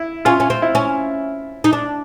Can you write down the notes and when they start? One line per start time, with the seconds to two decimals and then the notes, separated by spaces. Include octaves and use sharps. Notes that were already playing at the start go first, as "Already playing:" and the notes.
Already playing: E4
0.25 C#4 F4
0.40 C#4
0.50 C4
0.62 E4
0.75 C#4
1.64 D#4
1.73 D4